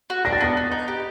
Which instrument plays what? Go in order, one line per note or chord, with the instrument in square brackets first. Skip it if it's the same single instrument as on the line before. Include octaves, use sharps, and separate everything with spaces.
[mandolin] F#4
[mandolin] D4 [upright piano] A#6
[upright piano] A6
[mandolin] B3 [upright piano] A#6
[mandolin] B3
D#4
G4